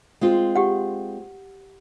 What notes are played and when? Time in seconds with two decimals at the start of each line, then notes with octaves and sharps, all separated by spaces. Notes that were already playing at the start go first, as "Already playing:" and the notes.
0.21 G#3 C4 F4
0.56 G4 F#5